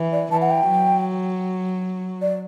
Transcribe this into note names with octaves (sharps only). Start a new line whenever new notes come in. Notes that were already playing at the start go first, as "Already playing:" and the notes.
Already playing: E3
D5
E3 A5
F#5
G5
F#3
D5